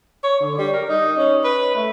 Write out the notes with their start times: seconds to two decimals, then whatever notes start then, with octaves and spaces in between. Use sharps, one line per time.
0.24 C#5
0.40 D3
0.58 G3
0.73 A#4
0.89 D#4
1.18 C#4
1.44 B4
1.76 A3